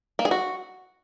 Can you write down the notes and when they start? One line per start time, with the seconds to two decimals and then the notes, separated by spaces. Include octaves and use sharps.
0.19 A#3
0.25 G#4
0.31 F#4